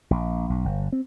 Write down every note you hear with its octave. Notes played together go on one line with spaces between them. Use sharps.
A#1
B1
G1
C4